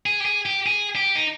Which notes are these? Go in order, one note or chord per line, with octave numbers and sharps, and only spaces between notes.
G#4
G4
G#4
G4
G#4
G4
D#4